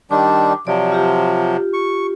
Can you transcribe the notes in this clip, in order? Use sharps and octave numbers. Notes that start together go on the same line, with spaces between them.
D#3 G3 D4 D6
C3 F3 F#3 D5
F4 G4
C#6